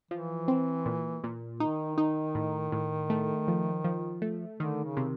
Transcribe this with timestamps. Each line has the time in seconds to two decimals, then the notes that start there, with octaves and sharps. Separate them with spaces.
0.11 E3 F3
0.48 C4
0.86 A#2
1.24 A#2
1.60 D#3 D#4
1.98 D#4
2.35 A2
2.72 A2
3.10 A3
3.48 F3
3.84 F3
4.22 A3
4.59 D3 D#3
4.84 C#3
4.97 C3